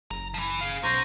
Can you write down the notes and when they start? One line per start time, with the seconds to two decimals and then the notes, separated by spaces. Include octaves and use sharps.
0.11 F#1 A#5
0.34 E3 F3
0.61 G#4 F5
0.83 B1 F#3 C#4 C5 A#5